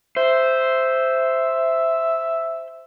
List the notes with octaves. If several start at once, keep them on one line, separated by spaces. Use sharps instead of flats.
C5 E5